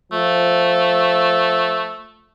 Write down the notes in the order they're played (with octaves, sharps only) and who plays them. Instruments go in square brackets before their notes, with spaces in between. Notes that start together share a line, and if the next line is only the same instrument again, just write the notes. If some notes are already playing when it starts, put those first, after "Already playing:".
[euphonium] F3 [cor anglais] A3